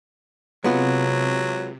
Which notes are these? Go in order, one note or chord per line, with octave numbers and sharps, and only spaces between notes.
C3 F#3 G#3 B3 F4